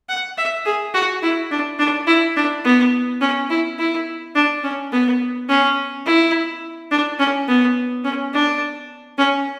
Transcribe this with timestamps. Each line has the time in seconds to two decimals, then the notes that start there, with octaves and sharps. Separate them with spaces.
0.09 F#5
0.38 E5
0.65 G#4
0.94 F#4
1.22 E4
1.51 D4
1.79 D4
2.07 E4
2.37 D4
2.65 B3
3.21 C#4
3.50 E4
3.79 E4
4.36 D4
4.64 C#4
4.92 B3
5.49 C#4
6.06 E4
6.91 D4
7.19 C#4
7.48 B3
8.04 C#4
8.33 D4
9.18 C#4